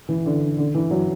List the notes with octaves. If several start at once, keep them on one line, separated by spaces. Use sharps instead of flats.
E3
D3
D3
E3
F#3